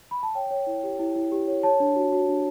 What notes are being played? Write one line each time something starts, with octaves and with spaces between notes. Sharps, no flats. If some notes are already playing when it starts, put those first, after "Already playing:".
B5
A5
C#5 G5
C#5
E4
G4
E4
E4
G4
C#5
C#5 A5
D4
F#4
F#4
D4